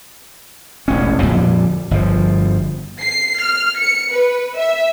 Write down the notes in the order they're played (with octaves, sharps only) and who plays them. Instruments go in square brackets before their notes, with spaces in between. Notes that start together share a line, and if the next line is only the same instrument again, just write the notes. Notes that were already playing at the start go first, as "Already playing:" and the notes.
[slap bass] E1 A1 C#4
F2 A#2 D3 G3
G1 F3
[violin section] C7
F6
C#7
B4
E5